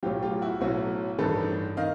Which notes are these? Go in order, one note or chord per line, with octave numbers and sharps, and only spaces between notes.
B1 A2 F#3 F4 G4
F4 G4
E4 F#4
B1 A2 F#3 E4 F#4
A1 G2 D#3 A4 B4
D#3 D#5 F5